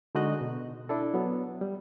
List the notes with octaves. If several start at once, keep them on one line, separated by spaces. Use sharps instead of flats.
D3 G#3 D#4 F#4 D#5 F#6
B2
D4 E4 A4
F#3 B3
G3